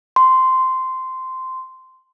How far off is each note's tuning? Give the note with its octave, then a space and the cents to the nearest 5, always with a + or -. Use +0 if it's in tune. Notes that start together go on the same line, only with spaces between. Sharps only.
C6 -10